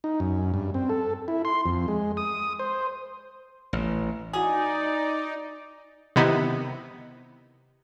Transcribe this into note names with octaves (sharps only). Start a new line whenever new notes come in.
D#4
F#2
G2
C4
A4
E4
C6
F2
G#3
D#6
C5
A1
D#4 E4 F#4 G#4 D5 F#5
C3 D#3 B3 D#4 E4